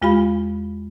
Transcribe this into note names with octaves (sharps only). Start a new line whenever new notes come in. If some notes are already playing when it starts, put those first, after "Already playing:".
E2 G#3 F4 G4 F5 B5